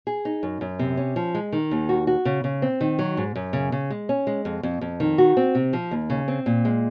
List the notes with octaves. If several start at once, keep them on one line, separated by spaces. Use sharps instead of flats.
G#4
D#4
F#2
F#2
C3
C#4
F3
G#3
D#3
D#2
F#4
F#4
C#3
C#3
C4
D#3
F#3
G#2
F#2
C#3
C#3
G#3
C#4
G#3
F2
F2
F2
D#3
F#4
C4
C3
F3
D#2
C#3
C4
A#2
G#3